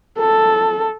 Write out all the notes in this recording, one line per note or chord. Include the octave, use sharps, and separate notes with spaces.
A4